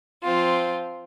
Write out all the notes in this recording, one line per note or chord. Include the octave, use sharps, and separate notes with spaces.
F3 C4 F4